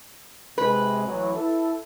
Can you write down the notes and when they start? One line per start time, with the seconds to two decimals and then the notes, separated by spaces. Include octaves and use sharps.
0.58 C3 G#3 B4
1.06 A1 E3 F#3
1.35 E4 A4